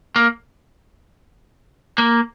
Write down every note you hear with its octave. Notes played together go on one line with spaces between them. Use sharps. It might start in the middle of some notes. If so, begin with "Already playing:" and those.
A#3
A#3